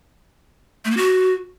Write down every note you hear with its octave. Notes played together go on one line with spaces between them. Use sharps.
A3
A#3
F#4